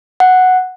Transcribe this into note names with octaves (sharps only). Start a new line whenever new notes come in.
F#5